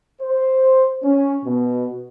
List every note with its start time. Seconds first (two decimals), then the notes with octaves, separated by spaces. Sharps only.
0.22 C5
1.03 C#4
1.45 B2